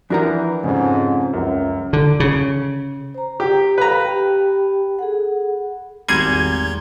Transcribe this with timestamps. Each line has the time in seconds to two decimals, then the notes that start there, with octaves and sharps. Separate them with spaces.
0.10 E3 F3 D4 F#4 A#4 A#5
0.64 F2 G#2 C#3
1.33 C#2 F#2
1.93 D3
2.20 C#3
3.15 C5 A#5
3.40 G4
3.78 A4 B4 F5 A#5
4.01 G4 G5 A5
4.99 G#4 A4 F#5
6.08 G#1 E2 G3 F#4 G#4 A#5 C6 G#6